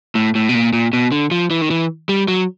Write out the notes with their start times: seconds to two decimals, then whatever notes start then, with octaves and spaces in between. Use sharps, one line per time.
0.15 A2
0.35 A2
0.49 B2
0.55 A#2
0.73 A#2
0.93 B2
1.12 D3
1.31 F3
1.51 E3
1.62 D#3
1.71 E3
2.09 G3
2.28 F#3